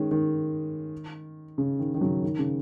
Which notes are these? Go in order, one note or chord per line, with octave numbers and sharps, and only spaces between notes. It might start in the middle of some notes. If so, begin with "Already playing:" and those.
Already playing: D#3 G#3 C#4
D#3
C#3
D#3
D#3
C#3 F#3
D#3
C#3